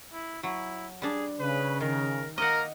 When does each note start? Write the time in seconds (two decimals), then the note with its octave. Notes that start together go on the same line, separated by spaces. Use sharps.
0.12 E4
0.43 F#3 E4
1.02 G3 D4 G#4
1.40 C#3 B4
1.81 D#3 A#4
2.38 A#3 A#4 D#5 F#5